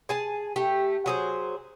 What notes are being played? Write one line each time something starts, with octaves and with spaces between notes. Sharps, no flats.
G#4 G#5 A5
A3 G4
F#3 G#4 C5